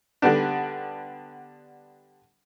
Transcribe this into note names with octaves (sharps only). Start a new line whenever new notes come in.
D3 G3 B3 D4